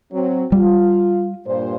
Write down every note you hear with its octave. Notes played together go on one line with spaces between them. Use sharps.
F#3 C4
G3 F4
G2 A#2 C5